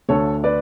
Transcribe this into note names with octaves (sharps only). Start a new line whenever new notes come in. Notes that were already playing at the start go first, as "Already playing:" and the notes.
D2 D3 A3 A4 C#5
B4 D5